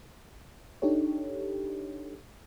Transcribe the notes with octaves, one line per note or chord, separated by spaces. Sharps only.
D4 D#4 G4 A4 C#5